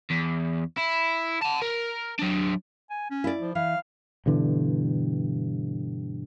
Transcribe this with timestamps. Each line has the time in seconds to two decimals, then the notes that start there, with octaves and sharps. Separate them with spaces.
0.11 E2
0.78 E4
1.42 F#5 A5
1.62 A#4
2.19 F#3 D4
2.90 G#5
3.10 C#4
3.24 E4 D5
3.41 F3
3.55 E3 F5
4.26 G2 B2 D3 E3